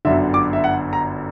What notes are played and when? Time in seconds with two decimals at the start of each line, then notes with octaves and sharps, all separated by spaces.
0.05 G1 F#2 D3 E5
0.34 D6
0.53 E5
0.64 F#5
0.93 A#5